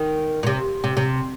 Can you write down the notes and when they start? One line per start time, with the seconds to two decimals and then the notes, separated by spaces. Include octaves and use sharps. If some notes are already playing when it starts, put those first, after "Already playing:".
Already playing: D#3
0.43 A#2
0.46 C3
0.84 C3
0.97 C3